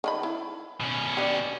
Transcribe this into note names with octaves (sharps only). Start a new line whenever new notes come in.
D#3 F4 B5
E4
B2 C#4
D4 G4